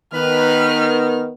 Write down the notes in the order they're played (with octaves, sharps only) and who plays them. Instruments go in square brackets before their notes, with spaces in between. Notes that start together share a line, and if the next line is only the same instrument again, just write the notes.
[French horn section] D#3 [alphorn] B3 [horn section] B4 [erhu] F6